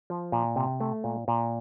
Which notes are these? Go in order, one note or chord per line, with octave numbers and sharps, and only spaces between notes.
F3
A#2
C3
A3
A#2
A#2